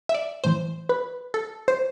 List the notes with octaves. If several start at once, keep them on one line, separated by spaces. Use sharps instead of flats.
E5
D5
A2 E3 C5
B4
A4
C5